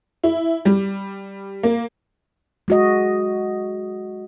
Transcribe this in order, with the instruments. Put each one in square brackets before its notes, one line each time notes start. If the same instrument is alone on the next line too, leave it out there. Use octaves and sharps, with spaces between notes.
[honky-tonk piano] E4
G3
A#3
[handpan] G#3 F#4 D#5